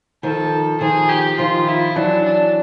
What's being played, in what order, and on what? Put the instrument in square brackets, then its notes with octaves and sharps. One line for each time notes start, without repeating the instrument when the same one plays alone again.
[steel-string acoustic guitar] D#3 F3 [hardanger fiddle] A4
[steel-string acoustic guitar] D#3 F3 [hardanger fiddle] G#4
[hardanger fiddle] G4
[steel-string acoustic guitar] D#3 F3 [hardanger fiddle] F4
[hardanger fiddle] E4
[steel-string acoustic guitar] E3 F#3 [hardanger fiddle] D4
[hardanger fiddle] D4